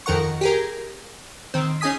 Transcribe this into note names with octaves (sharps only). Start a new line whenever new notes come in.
F2 D#3 A#4 F#5 C#6
G4 G#4 A#4
D#3 C4
C#4 D#4 G#4 G#5 D#6 B6